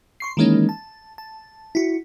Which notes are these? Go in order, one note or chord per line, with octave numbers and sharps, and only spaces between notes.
C6 C#6 C7
D#3 E3 G#3 A#3 C#4 D#4
A5
A5
E4 F#4